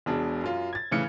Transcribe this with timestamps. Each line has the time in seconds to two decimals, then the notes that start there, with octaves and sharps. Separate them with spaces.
0.06 E1 B2 D4 G#4
0.44 F#2 F4
0.73 G#6 A6
0.91 A2 C#3 E3 F6 C#7